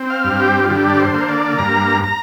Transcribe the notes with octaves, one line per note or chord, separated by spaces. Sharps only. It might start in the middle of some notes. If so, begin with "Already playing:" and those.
Already playing: C4
F5
G2
G4
F4
D3 G4
D5
C5
A#3
D5
G2 A#5
A#5